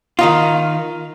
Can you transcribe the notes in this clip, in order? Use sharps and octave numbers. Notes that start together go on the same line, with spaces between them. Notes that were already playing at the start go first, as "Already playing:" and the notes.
D#3 D#4 F4